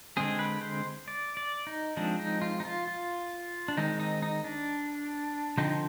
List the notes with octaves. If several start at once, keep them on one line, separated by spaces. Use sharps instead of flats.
D3 G#3 C4 G#4
B4
C5
D5
D5
D#4
F3 G#3 C4 D4
D#4
F4
D#4
F4
F4
D4
D#3 G#3 C4 D#4
D#4
D#4
D4
D3 F3 C4 D#4